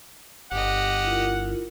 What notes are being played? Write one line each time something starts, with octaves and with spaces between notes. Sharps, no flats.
G1 G4 D#5 F#5
E4 F4 A#4